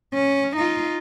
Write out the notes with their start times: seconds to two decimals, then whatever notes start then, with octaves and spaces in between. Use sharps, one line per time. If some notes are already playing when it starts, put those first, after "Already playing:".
0.14 C#4
0.56 D#4 F4